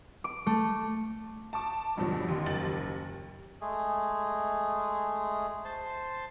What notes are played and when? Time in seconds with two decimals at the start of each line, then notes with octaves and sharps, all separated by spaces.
0.24 D6
0.46 A3
1.53 A5 C#6 D6
1.97 E2 G2 B2 D3 F3 F#3
2.27 A1 D#2 D#3 C6
2.46 F#1 D#2 A6 F#7
3.61 G#3 A3 G#4
5.65 C5 A5 C6